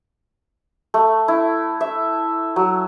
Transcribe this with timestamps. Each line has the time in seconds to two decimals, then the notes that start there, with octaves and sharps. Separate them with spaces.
0.94 A3
1.28 E4
1.81 E5
2.56 F#3